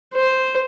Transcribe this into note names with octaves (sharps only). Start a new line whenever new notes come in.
C5